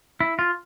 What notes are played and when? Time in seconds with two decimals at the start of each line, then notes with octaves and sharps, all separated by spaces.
0.20 E4
0.39 F4